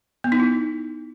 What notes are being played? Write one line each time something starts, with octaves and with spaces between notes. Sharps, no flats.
B3
D#4
E4